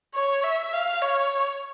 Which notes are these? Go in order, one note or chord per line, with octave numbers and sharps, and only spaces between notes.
C#5
E5
F5
C#5